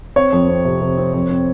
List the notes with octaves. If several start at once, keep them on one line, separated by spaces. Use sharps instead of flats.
C4 C#5
F2
C4
C3
C3
C4
F2
C4